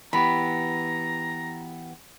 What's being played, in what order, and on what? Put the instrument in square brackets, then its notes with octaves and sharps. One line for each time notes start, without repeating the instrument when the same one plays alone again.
[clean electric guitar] E3 B3 G4 [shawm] A#5 [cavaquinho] B5